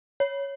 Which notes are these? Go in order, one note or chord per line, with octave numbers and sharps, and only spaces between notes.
C#5